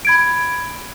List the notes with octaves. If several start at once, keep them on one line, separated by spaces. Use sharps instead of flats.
B5 G#6 D7